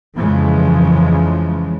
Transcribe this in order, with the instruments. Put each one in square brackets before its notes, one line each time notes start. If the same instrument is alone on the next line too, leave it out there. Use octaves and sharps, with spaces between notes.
[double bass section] F2 C#3 E3 F3 G#3